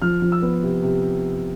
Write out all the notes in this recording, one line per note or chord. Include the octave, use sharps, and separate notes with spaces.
F3 F6
F3
E6
B3
C3
C3